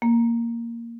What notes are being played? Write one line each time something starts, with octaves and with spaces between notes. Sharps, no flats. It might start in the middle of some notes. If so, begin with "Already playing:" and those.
A#3